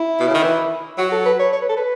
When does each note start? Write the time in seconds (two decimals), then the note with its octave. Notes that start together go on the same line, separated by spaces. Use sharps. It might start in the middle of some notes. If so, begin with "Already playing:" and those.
Already playing: E4
0.20 B2
0.28 C#3
0.35 D#3
0.43 E3
0.98 F#3 F#4
1.11 A4
1.25 B4
1.39 C#5
1.52 C#5
1.62 B4
1.69 A4
1.77 B4